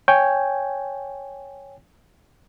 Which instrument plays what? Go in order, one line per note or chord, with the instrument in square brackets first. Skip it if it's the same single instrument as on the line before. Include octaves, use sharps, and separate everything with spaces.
[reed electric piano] C#5 G5 G#5